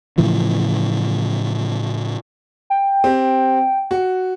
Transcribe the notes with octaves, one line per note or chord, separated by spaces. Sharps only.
A2 C#3 E3 F3
G5
C4 G4
F#4